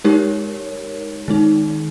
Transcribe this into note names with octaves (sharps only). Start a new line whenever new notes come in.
G#3 D#4 G4 A#4 C#5
D#3 G#3 D#4